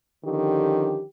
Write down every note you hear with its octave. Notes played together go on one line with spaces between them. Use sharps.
D3 D#3 F3 C#4 G4